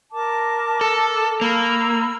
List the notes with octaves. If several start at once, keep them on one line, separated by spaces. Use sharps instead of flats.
A#4 A5 D6
A4
A#3 B5 E6